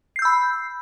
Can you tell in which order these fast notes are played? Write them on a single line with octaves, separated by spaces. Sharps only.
C7 G6 E6 B5